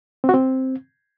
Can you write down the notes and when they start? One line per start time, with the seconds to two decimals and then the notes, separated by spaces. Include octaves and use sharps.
0.24 C4
0.29 F#4
0.34 C4